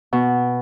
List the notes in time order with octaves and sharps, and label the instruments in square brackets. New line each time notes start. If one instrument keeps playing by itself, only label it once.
[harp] B2